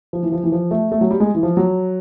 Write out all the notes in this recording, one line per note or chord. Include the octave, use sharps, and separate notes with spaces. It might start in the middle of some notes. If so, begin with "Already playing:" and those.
F3
E3
F3
E3
F3
A3
A3
F#3
G3
G#3
E3
F3
F#3